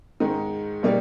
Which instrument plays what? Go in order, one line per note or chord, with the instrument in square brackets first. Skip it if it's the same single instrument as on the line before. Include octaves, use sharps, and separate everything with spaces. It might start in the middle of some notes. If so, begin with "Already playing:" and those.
[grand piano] G#2 D#3 G#3
B2 G3 A#3 D#4